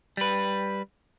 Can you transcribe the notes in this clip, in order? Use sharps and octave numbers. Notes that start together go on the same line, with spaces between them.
G3 B4